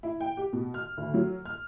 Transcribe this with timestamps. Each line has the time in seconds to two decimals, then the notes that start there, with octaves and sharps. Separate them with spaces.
0.03 E4
0.20 G5
0.37 G4
0.53 B2
0.74 F6
0.97 D2
1.14 F#3
1.45 F6